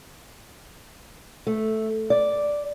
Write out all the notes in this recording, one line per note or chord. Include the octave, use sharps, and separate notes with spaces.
A3
D5